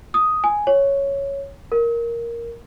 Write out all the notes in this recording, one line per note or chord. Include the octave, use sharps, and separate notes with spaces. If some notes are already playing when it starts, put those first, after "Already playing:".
D#6
G#5
C#5
A#4